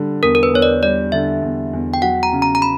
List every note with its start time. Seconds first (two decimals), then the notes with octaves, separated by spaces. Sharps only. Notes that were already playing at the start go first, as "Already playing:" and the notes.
Already playing: D3 G3
0.23 E2 A#4
0.35 A#4
0.43 B4
0.54 E2 C#5
0.62 D5
0.83 G3 D5
1.12 D3 E5
1.43 E2
1.73 E2
1.94 G5
2.02 F#3 F#5
2.23 A#5
2.33 C#3
2.42 A#5
2.55 A#5
2.62 B5